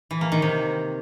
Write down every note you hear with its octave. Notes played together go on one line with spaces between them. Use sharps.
E3
A#3
D#3
C3